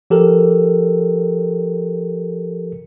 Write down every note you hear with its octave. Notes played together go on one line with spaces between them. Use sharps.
F3 G4 A4 A#4